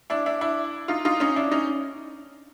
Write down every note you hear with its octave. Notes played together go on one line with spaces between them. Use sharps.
D4 E4
D4 E4
D4 E4
D#4 F4
D#4 F4
C#4 D#4
D4 E4
C#4 D#4